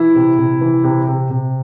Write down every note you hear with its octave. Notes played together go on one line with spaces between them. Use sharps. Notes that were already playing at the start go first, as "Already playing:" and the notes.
Already playing: E3 E4
C3
C3
E3
C3
C3
C3